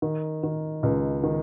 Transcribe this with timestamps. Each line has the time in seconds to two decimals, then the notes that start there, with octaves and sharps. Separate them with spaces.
0.02 D#3
0.43 D#3
0.83 C#2
1.23 D#3